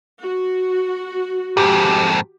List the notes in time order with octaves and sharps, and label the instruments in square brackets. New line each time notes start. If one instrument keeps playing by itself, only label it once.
[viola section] F#4
[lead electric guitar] F2 G#2 [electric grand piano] G4